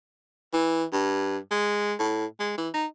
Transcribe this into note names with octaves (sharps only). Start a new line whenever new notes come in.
E3
G2
G#3
A2
G#3
E3
D#4